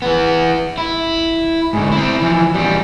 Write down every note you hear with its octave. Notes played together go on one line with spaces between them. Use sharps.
E3 B3
E4
G#2 D3
C4 E4
E3 F3
E2 G3